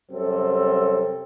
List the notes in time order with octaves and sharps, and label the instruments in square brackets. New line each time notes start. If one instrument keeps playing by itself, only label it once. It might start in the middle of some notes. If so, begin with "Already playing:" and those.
[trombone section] F#2 C3 F#3 G3 C4 A4